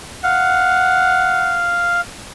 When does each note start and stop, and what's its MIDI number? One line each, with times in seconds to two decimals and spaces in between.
0.24 2.01 77
0.24 1.60 78